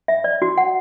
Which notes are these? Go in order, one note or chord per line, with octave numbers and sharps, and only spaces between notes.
E5
D5
F#4
F#5